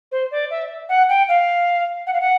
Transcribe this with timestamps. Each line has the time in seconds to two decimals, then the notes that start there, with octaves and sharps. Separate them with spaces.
0.12 C5
0.31 D5
0.51 E5
0.89 F#5
1.09 G5
1.29 F5
2.07 F#5
2.13 F5
2.21 F#5